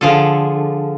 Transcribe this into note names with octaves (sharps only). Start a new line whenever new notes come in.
D3 F3 F4 G#4 A4